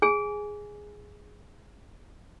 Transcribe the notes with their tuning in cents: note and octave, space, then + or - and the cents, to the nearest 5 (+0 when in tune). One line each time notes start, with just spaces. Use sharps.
G#4 +0 G#5 +0